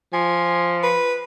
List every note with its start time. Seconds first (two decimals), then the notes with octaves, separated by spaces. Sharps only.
0.13 F3 G#5
0.83 B4